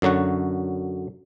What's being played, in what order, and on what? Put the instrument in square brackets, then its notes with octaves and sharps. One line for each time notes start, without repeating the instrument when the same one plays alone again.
[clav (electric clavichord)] F#2 D3 F#3 F#4 F#5